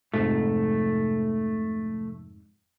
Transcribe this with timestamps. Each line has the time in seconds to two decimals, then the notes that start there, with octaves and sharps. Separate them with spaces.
0.14 F2 G#2 C3 F3 A3